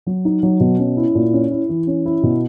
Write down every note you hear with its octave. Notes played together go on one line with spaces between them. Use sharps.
F#3
D#4
F#3
B2
C#4
E4
A#2
C#4
E4
E3
C#4
E4
B2